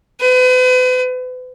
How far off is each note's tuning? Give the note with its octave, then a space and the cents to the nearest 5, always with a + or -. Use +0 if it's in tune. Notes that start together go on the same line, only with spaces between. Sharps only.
B4 +40